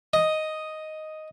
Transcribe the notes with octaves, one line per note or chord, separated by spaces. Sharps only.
D#5